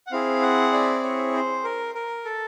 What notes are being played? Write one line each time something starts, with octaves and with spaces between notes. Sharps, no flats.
F#5
C4 E4 G#4 F5
F#5
D5
C#5
C5
A#4
A#4
A4